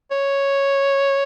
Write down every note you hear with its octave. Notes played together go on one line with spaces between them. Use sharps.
C#5